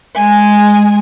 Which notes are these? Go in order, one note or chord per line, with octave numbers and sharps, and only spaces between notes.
G#3 G#5